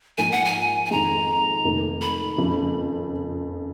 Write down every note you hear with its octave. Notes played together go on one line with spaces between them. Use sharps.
G#2 F3 A#3 G#5
F#5
G#5
G#5
F2 D#3 G#3 A#5
F1 F2 D#3 A#3
B5
F#1 F2 C#3 F3